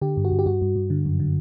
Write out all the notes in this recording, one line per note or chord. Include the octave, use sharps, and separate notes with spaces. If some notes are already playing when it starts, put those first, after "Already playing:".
D3 G4
G2
F#4
G2
G4
G2 F#4
G2
G2
D3
F#2
D3